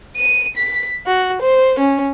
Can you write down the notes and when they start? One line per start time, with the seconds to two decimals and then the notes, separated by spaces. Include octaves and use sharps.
0.16 D#7
0.56 B6
1.06 F#4
1.42 C5
1.79 C#4